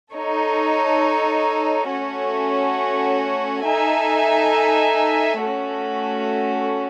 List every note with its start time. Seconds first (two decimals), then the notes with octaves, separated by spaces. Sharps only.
0.14 D#4 A4 C#5
1.91 A3 C#4 F#4 C#5
3.66 D#4 A4 E5 G#5
5.42 A3 C#4 F#4 A4